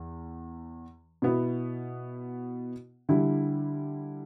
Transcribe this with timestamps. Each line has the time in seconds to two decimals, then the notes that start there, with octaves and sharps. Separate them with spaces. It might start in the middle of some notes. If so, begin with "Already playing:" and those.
Already playing: E2
1.22 B2 B3 E4
3.09 D3 G3 E4